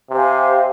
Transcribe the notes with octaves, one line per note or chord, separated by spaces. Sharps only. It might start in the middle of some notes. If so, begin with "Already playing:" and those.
C3 G4 C5 F5 G#5